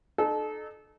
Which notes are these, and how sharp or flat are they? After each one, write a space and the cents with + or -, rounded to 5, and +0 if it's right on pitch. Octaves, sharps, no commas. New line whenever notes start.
D#4 -40 A4 -30